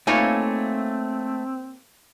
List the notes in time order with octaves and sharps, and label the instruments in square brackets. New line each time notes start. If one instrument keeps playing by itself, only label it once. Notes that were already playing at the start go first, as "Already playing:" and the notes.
[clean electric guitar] A3 [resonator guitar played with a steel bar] A#3 C#5 G#5 [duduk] C4 [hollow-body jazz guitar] D#4 F4 B4